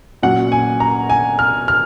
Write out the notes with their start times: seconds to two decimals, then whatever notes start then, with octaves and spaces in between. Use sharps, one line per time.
0.23 A#2 F#3 C#4 F#5
0.52 G#5
0.80 A#5
1.10 G#5
1.39 F6
1.68 F6